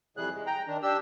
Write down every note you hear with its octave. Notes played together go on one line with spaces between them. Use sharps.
F2 C3 E3 G3 G#4 F#6
G#3
G5 A#5
D#3 D4
D4 G4 E6